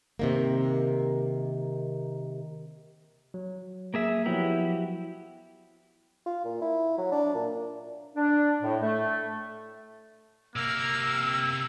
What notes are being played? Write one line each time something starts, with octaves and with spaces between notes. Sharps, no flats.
C3 D#3 A#3
F#3
A#3 G#4 E5
F3 F#3 B3 E4 F#4 G4
F4
A#2
E4
F#3
D4
A#2
D4
A2
A3
C3 A#3 A#4 E6